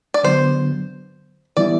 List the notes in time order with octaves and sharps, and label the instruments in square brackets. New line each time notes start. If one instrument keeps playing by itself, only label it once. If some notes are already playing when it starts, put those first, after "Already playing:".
[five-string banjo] D5
[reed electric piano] D3 F#3 B3 [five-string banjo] C5
[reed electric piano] E3 G3 B3 E4 [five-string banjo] D5